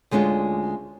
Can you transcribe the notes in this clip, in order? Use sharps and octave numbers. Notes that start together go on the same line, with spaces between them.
D2 G#3 C#4 D4 F4